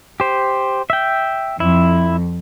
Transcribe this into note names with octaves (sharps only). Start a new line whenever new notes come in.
G4 C5
E5 G5
F2 E4